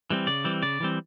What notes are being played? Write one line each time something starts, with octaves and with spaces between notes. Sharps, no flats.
E3 G3 C4
C#3 D5
E3 G3 C4
C#3 D5
E3 G3 C4